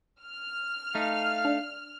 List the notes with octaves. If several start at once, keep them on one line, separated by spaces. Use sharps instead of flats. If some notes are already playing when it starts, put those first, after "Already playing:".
F6
A3 D#4 F5
D4